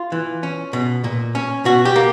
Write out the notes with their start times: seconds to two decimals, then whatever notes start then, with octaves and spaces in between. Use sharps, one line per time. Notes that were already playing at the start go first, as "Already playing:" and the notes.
Already playing: F4
0.12 E3
0.43 C#4
0.73 B2
1.04 A#2
1.35 C#4
1.65 B2 F#4
1.85 G4
1.96 A#3